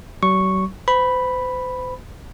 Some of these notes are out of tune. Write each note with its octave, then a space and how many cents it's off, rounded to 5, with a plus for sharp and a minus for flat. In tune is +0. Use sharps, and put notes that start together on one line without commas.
F#3 +45 C#6 -5
C5 -40 B5 +0